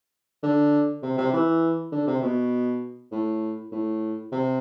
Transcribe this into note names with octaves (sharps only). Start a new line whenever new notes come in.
D3
C3
C3
E3
D3
C3
B2
A2
A2
C3